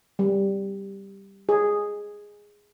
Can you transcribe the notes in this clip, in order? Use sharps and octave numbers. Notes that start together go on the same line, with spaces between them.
G3
G#4